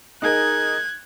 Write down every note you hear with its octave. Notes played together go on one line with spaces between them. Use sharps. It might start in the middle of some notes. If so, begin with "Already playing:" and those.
D#4 G#4 A#4 F#6 G#6